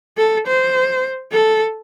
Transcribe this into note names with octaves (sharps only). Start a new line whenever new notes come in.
A4
C5
A4